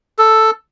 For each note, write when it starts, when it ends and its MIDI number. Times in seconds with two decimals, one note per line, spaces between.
0.19 0.51 69